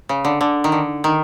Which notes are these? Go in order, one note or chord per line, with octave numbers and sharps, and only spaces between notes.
C#3
D3
D3
D#3
D3
D#3